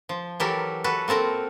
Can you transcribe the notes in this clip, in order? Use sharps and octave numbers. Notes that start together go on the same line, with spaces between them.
F3
E3 F#3 G4 A4 A#4
F#4 A4 B4
A#3 C4 A4 A#4 A#5